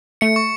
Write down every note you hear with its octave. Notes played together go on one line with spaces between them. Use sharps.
A3 C#7
C#6